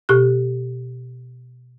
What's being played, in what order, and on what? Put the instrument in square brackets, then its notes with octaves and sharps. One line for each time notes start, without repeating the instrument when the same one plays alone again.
[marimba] B2 G4 F#6